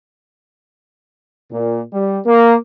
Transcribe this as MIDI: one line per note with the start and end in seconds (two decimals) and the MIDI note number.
1.51 1.82 46
1.93 2.19 55
2.26 2.54 58